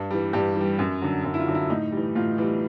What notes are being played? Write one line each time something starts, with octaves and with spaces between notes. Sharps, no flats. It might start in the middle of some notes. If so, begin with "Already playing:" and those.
Already playing: G2
E3 G3
G2 G4
E3 G3
F#2
D3 F#3
F#2
E4
F4
D3 F#3
E4
A2 D#4
E3 G3
A2 F4
E3 G3